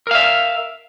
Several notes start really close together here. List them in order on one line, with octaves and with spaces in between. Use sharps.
A#4 F5 E5